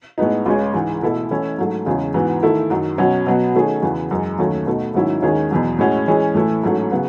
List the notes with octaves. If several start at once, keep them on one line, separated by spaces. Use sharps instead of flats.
A2 G#3 B3 D#4
C#2 C#3 G#3 C#4
G#2 E3 G#3
B2 A3 E4 A4
E3 A3 C#4 E4
G#2 F#3 A3
E2 C#3 G#3 C#4
G#2 E3 B3 F#4
D#3 A3 E4 A4
F#2 D#3 F#3
B2 F#3 C#4 F#4
B2 F#3 B3 F#4
D#3 A3 C#4 G#4
E2 C#3 E3 B3 F#4
F#2 E3 G#3
D#2 D#3 F#3 A3 C#4
B2 A3 D#4 F#4
G#2 D#3 F#3 C#4 E4
D#2 D#3 G#3 C#4 G#4
E2 B2 F#3
A2 G#3 C#4 F#4
E3 G#3 C#4 G#4
A2 E3 A3 E4
G#2 F#3 A3 C#4
C#3 F#3 B3